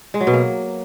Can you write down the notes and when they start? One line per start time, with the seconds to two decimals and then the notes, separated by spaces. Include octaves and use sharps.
0.14 G#3
0.20 F#3
0.27 B2
0.33 A#3